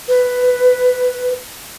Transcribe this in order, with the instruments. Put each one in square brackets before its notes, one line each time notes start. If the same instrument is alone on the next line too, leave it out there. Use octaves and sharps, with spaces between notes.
[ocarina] B4